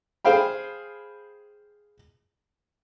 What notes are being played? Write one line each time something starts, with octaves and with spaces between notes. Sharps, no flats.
G#4 C5 F5 G5 B5